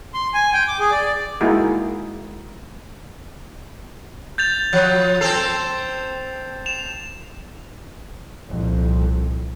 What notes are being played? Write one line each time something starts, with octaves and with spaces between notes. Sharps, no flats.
C6
G#5
G5
D6
G#4
D5
G#3 A#3 D#4 E4 F#4 G#4
G6 A6 F7
F3
C4 A4 C7 F7
E7 F7
C2 F2 A#2